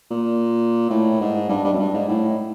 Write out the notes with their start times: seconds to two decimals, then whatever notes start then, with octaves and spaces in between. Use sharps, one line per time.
0.11 A#2
0.90 A2
1.21 G#2
1.50 G2
1.65 G2
1.73 F#2
1.80 G2
1.94 G#2
2.09 A2